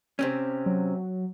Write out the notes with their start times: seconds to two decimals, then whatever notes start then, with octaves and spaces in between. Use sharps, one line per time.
0.19 C3 C4 C#4
0.66 F#3